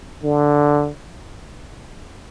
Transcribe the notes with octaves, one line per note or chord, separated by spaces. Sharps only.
D3